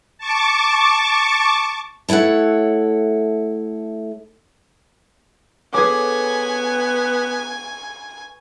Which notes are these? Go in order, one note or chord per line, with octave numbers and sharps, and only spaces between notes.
A5 C#6 D6
A3 E4 A4 C#5 F#5
B3 G#4 A4 B4 C#5 G#5 D6